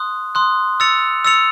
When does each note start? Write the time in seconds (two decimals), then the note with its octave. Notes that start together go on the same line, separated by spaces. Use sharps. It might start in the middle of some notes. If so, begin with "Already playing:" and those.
Already playing: C6 D#6 F#6
0.35 C6 D#6 F#6
0.80 E6 A6 C#7 F7
1.25 E6 A6 C#7 F7